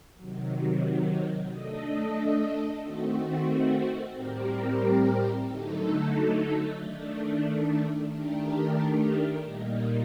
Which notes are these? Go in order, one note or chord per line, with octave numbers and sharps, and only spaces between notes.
C3 D#3 F#3
A3 D4 A4 D#5
D#3 A3 C4 F#4
A2 G3 C4 G4 A#4
D3 F#3 A3 D#4 A4
D#3 A3 D4
D#3 A3 D4 G4 A#4
A#2 G3 A#3 D#4